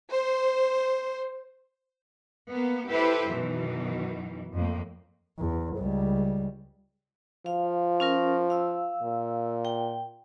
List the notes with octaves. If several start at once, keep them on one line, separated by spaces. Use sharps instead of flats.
C5
A#3 B3
E4 G4 A4 B4 C5 E5
F#2 B2 D#3 E3
F2 A2 A#3
E2
C#2 G3
F3 F5
C#4 F4 A#4
F5 E6
A#2
G5